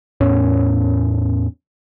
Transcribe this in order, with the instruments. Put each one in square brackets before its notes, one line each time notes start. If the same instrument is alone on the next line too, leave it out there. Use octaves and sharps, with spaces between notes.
[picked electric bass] E2 A2 C#4